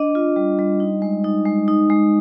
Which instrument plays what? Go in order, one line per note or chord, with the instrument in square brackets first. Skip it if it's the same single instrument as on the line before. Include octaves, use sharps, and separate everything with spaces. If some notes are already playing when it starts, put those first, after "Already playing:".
Already playing: [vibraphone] D4 D#5
F4
G3
G3
D#4
G#3
D#4
G#3
D#4
G#3